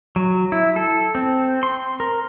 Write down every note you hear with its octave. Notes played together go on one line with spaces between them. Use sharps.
F#3
E4
A4
C4
C6
A#4